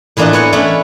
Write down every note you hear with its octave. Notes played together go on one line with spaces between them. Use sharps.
A2 E3 A#3 D4 F4 D#5
B3 C#5 F#5 G#5
A3 B3 C#4 D4 E4 A4